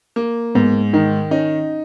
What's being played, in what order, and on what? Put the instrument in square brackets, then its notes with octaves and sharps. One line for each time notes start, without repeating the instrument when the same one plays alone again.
[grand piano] A#3
[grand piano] G#2 [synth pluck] B3
[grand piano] D#3 [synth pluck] D#4
[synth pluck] C#4 [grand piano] D#4